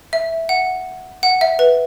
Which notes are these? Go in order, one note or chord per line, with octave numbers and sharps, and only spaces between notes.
E5
F#5
F#5
E5
B4